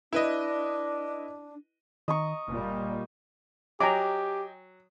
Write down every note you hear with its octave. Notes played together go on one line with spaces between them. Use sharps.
D4 E4 B4 D#5
D#3 D#5 A#5 C#6
F#1 A#2 G3
F#3 G4 D#5 G5 G#5 A#5 D6